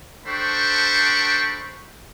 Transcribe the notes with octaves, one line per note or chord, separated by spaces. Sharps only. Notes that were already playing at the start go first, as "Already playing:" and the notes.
D4 A4 C5 G5 B5 C#6